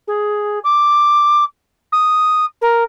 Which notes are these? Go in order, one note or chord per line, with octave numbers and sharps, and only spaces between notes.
G#4
D6
D#6
A#4